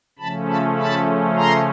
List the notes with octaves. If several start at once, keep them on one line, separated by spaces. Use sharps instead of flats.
C#3 F3 A3 C#4 A5 B5
A5 B5
A5 B5
A#5 C6